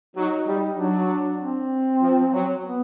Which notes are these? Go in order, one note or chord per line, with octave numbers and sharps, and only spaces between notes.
F#3 D#4
G3
F#3 D4
C4
F3
F#3
B3